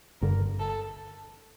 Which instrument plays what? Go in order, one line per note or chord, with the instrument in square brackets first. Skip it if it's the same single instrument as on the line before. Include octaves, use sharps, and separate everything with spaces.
[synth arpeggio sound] G1 G2 D3 [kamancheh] A#4
[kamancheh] A4